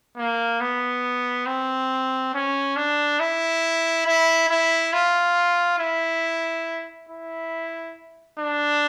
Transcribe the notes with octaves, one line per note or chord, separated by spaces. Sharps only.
A#3
B3
C4
C#4
D4
E4
E4
E4
F4
E4
E4
D4